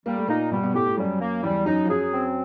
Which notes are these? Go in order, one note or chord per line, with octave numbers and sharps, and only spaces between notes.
G3 A#3
A3
A#2 A#3 D#4
B2 G3 B3
B2 B3
A2 A3 G4
A2 A3
F#2 F#3 G3
A#3
E2 E3 G3
F#2 F#3 D#4
F3
F#2 F#3 G#4
C4